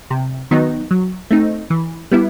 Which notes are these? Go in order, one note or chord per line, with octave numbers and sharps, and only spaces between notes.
C3
D#3 F#3 B3 D#4
F#3
A3 C4 D#4
E3
G3 B3 E4